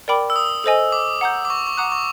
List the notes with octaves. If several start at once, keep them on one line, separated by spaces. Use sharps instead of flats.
A#4 D5 G5 B5 D6
E6
D#6
A4 C5 D#5 G#5
D6
F#5 A#5 D#6 G6
D6
C#6
C#6
F#5 A#5 D6 D#6 F#6
C#6